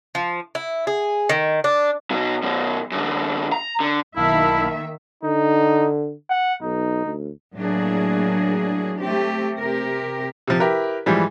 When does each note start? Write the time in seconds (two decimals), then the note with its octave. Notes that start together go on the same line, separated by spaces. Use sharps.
0.15 F3
0.55 E4
0.87 G#4
1.29 D#3
1.64 D4
2.11 B2 F#3
2.43 F#2 B2
2.92 F#2 D3
3.52 A#5
3.80 D3
4.16 B1 D#3 A#3 E4 E5 F5 A5 B5
5.23 D3 D#4
6.30 F#5
6.62 B1 D#4
7.05 D2
7.56 A2 F#3 A#3 D4 G#4
8.99 A3 C4 G4
9.59 C3 G4 A#4
10.47 C3 F3
10.60 E4 G4 A#4 B4
11.06 G#2 E3 F3 G3